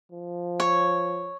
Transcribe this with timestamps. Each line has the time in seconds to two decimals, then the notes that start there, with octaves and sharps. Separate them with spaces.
0.11 F3
0.60 C#5